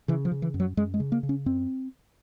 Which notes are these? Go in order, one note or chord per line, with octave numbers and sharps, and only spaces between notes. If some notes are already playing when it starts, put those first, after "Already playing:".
C#3 E3
F3
C#3
E3
F#2
F#3
F#2 G#3
G#3
C#3
A#3
C#3
C#4
F#2 C4